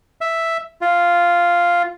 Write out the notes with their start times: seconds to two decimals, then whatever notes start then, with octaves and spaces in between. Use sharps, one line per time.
0.21 E5
0.81 F4